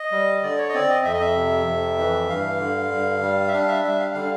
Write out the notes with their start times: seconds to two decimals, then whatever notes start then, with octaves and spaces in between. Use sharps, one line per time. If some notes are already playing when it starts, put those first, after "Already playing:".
Already playing: D#5
0.12 G3
0.43 D3 D5
0.59 C#5
0.69 D#5
0.74 C4 D5
0.90 D#5
1.05 F2 E5
1.14 D#5
1.21 E5
1.36 C3
1.67 F2
1.98 E3
2.29 G2 F5
2.59 D3
2.92 G2
3.22 G3
3.48 E5
3.53 D4 F5
3.68 E5
3.84 G3 E5
4.00 F5
4.14 D3 F5